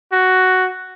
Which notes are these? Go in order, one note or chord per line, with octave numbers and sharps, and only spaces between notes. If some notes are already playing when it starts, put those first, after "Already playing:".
F#4